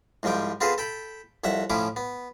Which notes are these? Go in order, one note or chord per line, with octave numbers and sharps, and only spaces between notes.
C2 G#2 F3 G3 G5
B3 C4 F4 G#4 A4 B4
A4 G5 B5
C2 F2 C#5 E5 F#5
A2 F3 C#4 E4 D6
B3